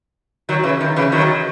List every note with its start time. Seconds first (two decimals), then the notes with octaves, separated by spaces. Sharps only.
0.49 D#3 F#3
0.63 C#3 E3
0.81 D#3
0.96 C#3 E3
1.12 D#3 F#3